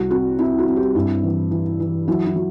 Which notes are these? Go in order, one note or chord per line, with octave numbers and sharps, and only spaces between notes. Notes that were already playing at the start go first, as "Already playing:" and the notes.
Already playing: C2 F#4
C4 F#4
C4 E4
F#4
C4
G4
G2 E4
E3
E3
E3
F#3 E4
E4
F#3